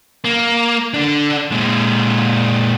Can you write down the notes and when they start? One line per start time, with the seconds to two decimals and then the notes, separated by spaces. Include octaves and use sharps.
0.24 A#3
0.94 D3 D4
1.52 A#2 G#3